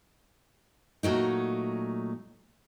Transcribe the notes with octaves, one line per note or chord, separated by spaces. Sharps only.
A#2 F#3 A3 D#4